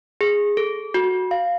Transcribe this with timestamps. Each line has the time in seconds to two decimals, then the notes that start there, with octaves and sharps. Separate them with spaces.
0.21 G#4
0.57 A4
0.94 F#4
1.31 F5